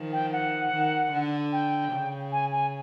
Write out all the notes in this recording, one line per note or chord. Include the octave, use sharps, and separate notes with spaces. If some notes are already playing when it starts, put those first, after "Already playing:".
Already playing: D#3 F3
G5
F#5
D#3
D3
G5
C#3
G#5
G#5